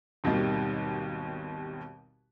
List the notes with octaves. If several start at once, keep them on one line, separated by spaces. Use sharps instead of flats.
G#1 D#2 B2 D#3 G3